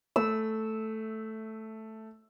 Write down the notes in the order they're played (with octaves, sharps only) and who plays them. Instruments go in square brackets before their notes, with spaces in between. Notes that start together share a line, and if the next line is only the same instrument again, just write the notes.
[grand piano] A3 [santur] E6